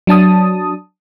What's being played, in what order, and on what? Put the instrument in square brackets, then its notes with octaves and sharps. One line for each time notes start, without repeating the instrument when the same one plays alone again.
[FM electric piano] F#3 D4 A5 D#6